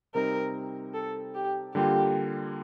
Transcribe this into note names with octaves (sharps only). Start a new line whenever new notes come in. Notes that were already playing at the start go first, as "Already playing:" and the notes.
C3 G3 C4 D#4 A#4
A4
G4
D3 G3 A#3 F4 G4